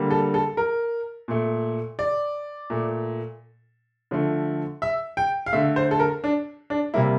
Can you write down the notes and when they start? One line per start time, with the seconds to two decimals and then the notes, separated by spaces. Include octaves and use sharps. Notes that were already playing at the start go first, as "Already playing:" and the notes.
Already playing: D3 G3 A#3
0.10 A4
0.34 A4
0.57 A#4
1.28 A#2 A3
1.99 D5
2.70 A#2 A3
4.11 D3 F3 A3
4.82 E5
5.17 G5
5.46 F5
5.53 D3 A3 E5
5.76 C5
5.91 A4
6.00 A#4
6.24 D4
6.70 D4
6.94 C3 G3 A#3 E4